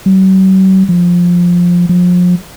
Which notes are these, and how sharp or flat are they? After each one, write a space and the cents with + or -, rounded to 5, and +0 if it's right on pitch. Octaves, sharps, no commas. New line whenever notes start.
F#3 +45
F3 +10
F3 +35